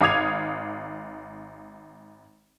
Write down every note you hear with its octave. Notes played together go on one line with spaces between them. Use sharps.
G#1 F5 D6 D#6 G#6 F7